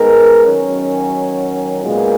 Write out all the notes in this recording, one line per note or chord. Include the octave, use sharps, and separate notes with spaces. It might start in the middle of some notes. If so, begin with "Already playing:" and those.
Already playing: G#3 B3 D#4 A#4
D#3 F#3 C#4
A#2 G#3 B3